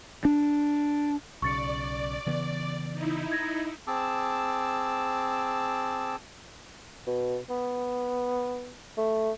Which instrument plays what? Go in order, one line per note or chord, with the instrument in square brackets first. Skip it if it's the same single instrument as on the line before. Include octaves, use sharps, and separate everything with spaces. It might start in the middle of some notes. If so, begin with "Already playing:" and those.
[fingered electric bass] D4
[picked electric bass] B1 C#3 [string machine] D5 [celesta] C#6 A6 C#7
[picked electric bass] C#3 E3 B3
[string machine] D#4 E4
[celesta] G#6 A#6
[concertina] C4 G#4 A5 D6 E6
[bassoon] B2
B3
A3